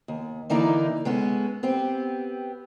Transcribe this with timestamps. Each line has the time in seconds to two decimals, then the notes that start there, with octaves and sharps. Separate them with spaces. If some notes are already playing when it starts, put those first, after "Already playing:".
0.08 D#2
0.50 D3 E3 A#3 D#4 E4 D5
1.05 G#3 B3 C#4 A4
1.63 B3 C4 G4